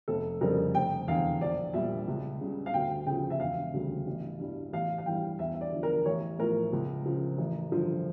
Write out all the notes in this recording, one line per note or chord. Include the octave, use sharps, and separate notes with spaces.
F1 A4
F2 C#3 G3 A#4
F1 G5
E2 D3 F5
A#1 D5
A#2 G3 E5
C#2
C#3 G3
F5
D2 G5
C#3 F3 G5
E5
E1 F5
D2 C#3 G3
A1
G2 E3 G3
A1 F5
F5
G2 E3 G3 G5
E2 E5
E5
D5
D3 F3
A#4
A1 C#5
A2 F3 A#4
C#2
C#3 F3
A1
G2 D3 F3